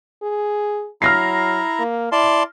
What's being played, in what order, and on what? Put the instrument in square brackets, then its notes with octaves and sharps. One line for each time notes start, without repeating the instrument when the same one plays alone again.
[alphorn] G#4
[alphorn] F#3 [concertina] E4 A#5 [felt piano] F6 A#6 C7
[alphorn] A#3
[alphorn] E4 [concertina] D5 A5 C6